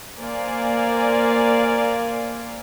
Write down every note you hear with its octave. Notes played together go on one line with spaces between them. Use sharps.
A#3 A#4 C5 D5 F5 G#5